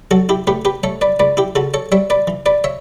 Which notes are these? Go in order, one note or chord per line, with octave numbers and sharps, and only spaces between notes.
F#3 F#4 A4
E4 G4
A2 G4 B4
G4 B4
A3 A4 C#5
B4 D5
C#2 B4 D5
E4 G4
C#3 F#4 A4
A4 C#5
G3 C#5 E5
B4 D5
E3
B4 D5
C#5 E5